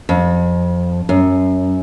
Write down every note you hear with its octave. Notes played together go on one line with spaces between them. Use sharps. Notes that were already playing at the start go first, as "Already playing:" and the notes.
F2
F#2